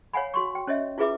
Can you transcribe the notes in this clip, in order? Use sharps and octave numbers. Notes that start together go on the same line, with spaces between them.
C#5 F5 F#5 G#5 B5
F#4 C6 C#6
G5
C#4 C#5 D#5 E5
E4 F4 G#4 B4 E5 D6